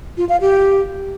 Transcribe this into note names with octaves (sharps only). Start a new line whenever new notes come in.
F4
F5
G4